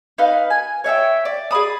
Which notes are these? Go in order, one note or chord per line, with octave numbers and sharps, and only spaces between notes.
D#4 B4 F5
G#5
C#5 D#5 E5 G5
D5
G#4 D5 B5 D#6